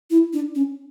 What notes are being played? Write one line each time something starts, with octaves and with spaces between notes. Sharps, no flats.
E4
D4
C#4